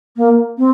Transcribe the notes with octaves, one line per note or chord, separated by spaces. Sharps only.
A#3
C4